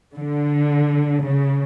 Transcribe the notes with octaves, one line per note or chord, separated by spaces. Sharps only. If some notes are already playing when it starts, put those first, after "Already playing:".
D3
C#3